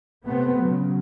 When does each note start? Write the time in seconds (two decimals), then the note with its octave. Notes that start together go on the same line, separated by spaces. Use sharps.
0.24 C3 A3 B3 C4
0.59 C#3 F#3